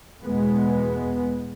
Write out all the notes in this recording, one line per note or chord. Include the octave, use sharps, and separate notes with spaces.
E2 B2 G#3 B3